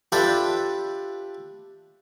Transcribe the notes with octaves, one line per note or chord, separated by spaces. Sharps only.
D4 F4 G4 A4 B4 E5